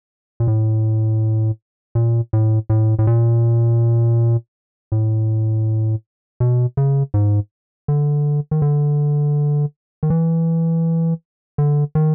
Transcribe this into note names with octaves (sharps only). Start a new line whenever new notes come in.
A#2
A2
A#2
A2
A2
A2
A#2
A2
B2
C#3
G#2
D3
D#3
D3
D#3
E3
D3
D#3